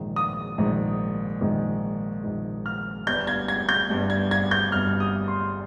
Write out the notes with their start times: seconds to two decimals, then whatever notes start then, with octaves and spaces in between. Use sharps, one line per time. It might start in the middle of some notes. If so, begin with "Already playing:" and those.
Already playing: A#1 G#2 D#3
0.16 D#6
0.58 A#1 G#2 D#3
1.41 A#1 G#2 D#3
2.23 A#1 G#2 D#3
2.66 F6
3.07 G1 G2 G3 G6
3.27 G#6
3.48 G#6
3.69 G6
3.90 G1 G2 G3
4.10 G#6
4.31 G#6
4.51 G6
4.72 G1 G2 G3 F6
5.00 D#6
5.28 C6